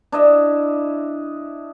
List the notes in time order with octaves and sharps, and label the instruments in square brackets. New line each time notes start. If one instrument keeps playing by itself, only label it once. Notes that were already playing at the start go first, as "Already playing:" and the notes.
[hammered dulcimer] D4 E4 D#5 E5